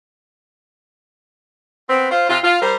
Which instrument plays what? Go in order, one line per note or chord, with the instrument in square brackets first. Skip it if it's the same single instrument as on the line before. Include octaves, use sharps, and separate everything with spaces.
[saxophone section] B3 C4
F4 C5
C3 F4
F4
G3 A#4 C5